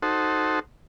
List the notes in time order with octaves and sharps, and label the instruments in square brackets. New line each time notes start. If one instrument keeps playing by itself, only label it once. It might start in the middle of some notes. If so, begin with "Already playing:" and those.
[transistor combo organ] D#4 F#4 A4 C5